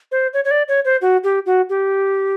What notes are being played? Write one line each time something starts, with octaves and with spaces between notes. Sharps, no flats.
C5
C#5
C#5
D5
C#5
C5
F#4
G4
F#4
G4